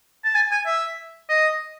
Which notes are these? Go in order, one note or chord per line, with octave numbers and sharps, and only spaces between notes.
A5
G#5
G#5
E5
D#5